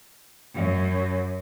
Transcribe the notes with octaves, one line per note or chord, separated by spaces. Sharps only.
F#2